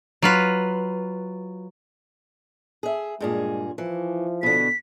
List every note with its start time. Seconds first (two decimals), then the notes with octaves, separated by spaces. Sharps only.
0.22 F#3 F4 B4
2.83 G#4 E5
3.20 G2 A#2 G#3 G#4
3.78 E3 F3
4.43 B2 D3 B6